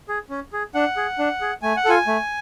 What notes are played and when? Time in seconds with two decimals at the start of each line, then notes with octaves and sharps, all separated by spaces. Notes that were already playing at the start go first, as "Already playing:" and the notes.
0.09 G#4
0.30 C#4
0.53 G#4
0.74 D4 F#5
0.97 G#4
1.19 D4
1.41 G#4
1.62 A3 G#5
1.77 F#5
1.85 F4 A4 G#5
2.07 A3